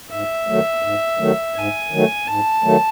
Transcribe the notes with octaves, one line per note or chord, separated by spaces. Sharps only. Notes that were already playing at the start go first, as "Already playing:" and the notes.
G#2 E5
D#3 F#3 A3
G#2
D#3 F#3 A3
G#2 G#5
D#3 F#3 A3
G#2 A5
D#3 F#3 A3